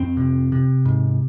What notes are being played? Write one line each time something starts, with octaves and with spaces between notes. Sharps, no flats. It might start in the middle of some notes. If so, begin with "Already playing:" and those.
Already playing: F2 C4
C3
C3
G#2